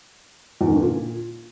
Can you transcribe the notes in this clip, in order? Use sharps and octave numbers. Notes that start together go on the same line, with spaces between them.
E2
D#3
D3
A#2